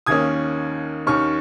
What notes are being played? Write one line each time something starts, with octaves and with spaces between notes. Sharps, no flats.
D#2 D#3 A#3 C#4 D#6 G#6
D#2 D#3 C#4 C#6 F6